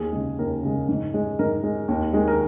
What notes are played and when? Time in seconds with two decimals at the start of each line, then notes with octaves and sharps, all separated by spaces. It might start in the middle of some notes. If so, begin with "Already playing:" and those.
Already playing: D#2 G#4
0.13 C#3 G#3
0.39 D#2 A#4
0.63 C#3 G#3
0.89 G#2
1.14 G#3
1.39 G#2 A#4
1.63 G#3
1.88 D#2
2.13 D#3 G#3
2.28 A#4